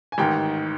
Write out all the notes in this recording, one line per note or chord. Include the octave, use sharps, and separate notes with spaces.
G#5
A1 G#2 D#3 G5